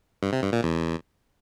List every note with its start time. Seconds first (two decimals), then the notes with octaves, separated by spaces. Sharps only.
0.23 G2
0.33 C3
0.43 G2
0.53 A#2
0.63 E2